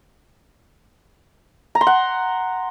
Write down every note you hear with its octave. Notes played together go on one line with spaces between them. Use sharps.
A#5
C6
F#5